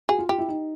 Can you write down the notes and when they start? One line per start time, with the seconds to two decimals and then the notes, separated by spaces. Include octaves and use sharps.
0.09 F#4 G#4
0.19 F4
0.29 F4 G4
0.38 E4
0.49 D#4